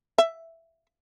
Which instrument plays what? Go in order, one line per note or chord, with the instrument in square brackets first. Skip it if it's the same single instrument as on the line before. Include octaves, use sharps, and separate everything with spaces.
[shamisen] E5